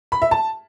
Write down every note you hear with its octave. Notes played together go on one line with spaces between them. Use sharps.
B5
E5
A5